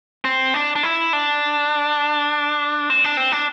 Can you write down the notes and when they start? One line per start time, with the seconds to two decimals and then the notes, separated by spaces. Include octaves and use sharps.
0.25 C4
0.54 D4
0.76 D4
0.83 E4
1.13 D4
2.90 C4
3.04 D4
3.17 C4
3.32 D4